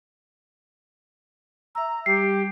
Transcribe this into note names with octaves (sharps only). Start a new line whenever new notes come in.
E5 A#5 E6
G3 G4 C7